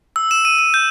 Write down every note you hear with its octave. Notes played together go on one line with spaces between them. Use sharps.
E6
E7
D#7
D#7
G6